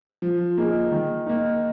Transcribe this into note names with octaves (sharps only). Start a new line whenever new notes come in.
F3
A#3 D#4 G#4
D#3
A#3 D#4